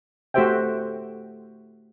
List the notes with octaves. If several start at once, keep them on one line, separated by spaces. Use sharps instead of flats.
A3 F#4 G4 C5 E5 G5